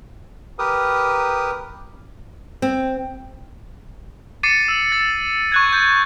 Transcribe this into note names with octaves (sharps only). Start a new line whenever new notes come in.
G4 A#4 B4 D#6
C4
D6 A6 C7 C#7 D#7
E6
A6
C#6 F#6 G#6
G6 A6